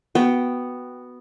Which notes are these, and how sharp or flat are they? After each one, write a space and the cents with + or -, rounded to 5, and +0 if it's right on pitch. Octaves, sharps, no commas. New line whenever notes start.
B3 +0 F#4 +0 G5 -10